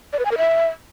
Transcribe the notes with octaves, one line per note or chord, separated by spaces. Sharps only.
D5
B4
G#5
A#4
E5